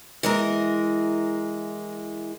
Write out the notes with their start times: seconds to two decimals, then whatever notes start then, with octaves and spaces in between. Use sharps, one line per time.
0.23 E3 G#3 A#4